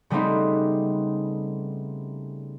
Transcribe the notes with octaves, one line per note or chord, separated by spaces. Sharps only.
C#3 G3 A3 B3 C4 D#4